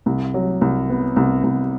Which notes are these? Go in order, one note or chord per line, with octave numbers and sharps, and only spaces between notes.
C2
F#3
C2
B3
C2
C2